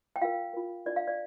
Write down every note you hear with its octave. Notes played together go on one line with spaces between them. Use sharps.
G5
F4 A#4 F5
F4 A#4
D4 F4 A#4 D5
F5
D5